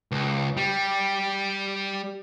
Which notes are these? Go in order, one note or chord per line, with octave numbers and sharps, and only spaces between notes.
C#2
G3